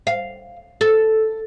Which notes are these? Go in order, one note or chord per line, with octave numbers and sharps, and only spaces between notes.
F5
A4